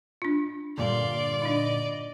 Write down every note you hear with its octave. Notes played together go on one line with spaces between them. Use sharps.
D4 F4
G2 A#2 D3 D5 F5 C6
D4 D#4 D#5